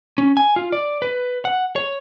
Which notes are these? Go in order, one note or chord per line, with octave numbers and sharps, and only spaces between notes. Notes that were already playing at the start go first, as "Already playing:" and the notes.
C#4
G#5
F4
D5
B4
F#5
C#5